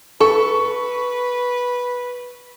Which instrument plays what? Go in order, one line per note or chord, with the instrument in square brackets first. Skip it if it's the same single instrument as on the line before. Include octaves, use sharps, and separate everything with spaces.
[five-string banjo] A4 [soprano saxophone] B4 [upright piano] C#6